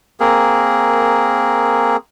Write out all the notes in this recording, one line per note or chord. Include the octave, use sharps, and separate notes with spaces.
A#3 C4 G#4 A#4